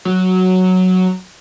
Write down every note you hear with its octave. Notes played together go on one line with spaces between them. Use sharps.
F#3